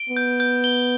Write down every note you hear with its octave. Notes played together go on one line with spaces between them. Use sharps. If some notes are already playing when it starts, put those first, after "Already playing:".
Already playing: D7 G7
B3
G6
G6
G7